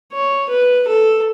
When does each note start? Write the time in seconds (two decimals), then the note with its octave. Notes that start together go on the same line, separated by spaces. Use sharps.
0.13 C#5
0.50 B4
0.88 A4